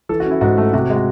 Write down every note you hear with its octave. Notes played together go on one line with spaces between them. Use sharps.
E3 A4
F#4
C#4
E4
G#2 F#4
A3
C3 F#4
G#3
F#4